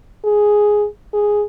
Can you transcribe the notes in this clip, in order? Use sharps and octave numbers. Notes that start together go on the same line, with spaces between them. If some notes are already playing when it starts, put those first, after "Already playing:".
G#4
G#4